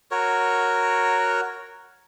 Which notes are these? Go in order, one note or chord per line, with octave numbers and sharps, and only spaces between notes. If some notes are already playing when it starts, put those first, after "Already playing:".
F#4 A#4 C#5